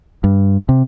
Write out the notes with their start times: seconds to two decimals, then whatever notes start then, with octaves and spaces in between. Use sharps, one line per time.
0.24 G2
0.69 C3